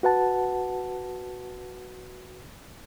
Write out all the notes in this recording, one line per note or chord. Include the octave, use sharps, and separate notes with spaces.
F#4 B4 F#5 A5